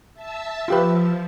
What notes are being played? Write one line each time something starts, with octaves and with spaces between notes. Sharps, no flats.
E5 A5 E6
F3 F4 G4 B4